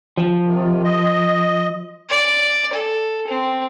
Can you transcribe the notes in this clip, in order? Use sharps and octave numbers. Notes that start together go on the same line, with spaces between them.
F3
C3 D#3
D#5
D5
A4
C4